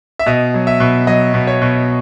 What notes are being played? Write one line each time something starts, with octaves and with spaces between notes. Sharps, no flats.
E5
B2 D#5
F#3
E5
B2
F#3 D#5
B2
C#5
B2